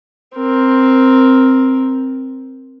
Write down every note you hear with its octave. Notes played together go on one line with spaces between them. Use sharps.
C4 A#4